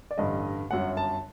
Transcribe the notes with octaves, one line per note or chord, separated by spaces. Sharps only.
D5
A1 G2 D3 G3 D#5
G1 F#2 F#3 F#5
A5